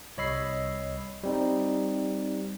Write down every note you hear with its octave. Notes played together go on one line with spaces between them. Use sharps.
C2 C#5 D#5 B5 E6 C7
G3 C4 D#4